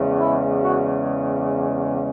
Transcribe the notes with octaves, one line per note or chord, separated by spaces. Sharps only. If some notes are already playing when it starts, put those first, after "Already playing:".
Already playing: E2 C#3 G#3
E4
F#4